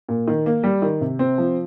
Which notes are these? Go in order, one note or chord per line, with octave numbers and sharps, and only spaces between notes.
A#2
D#3
A#3
G3
D#3
C3
C4
F3